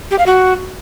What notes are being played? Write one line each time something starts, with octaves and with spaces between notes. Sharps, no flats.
G4
F5
F#4